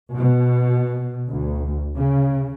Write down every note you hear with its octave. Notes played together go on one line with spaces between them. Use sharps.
B2
D2
C#3